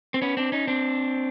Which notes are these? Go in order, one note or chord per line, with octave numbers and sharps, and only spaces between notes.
C4
B3 C#4
C4 D4
C#4 D#4
C4 D4